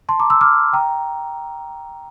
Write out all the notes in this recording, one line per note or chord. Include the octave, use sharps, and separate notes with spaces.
A5 C6
A#5 D6
C6 E6
D6 F6
G5 A#5